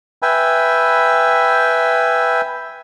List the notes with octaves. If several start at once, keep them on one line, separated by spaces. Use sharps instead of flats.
B4 E5 G5 G#5